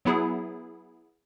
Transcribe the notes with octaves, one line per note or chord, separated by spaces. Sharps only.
F#3 B3 E4 G#4